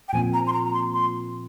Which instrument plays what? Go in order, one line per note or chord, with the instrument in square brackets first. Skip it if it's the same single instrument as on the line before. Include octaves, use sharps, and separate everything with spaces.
[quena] G5
[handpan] A#2 F3 C4 [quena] G#5
[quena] A#5
C6
A#5
A#5
C6
C6